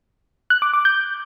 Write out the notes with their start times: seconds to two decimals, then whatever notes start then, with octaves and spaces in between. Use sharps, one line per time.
0.50 F#6
0.62 D6
0.74 D6
0.85 G6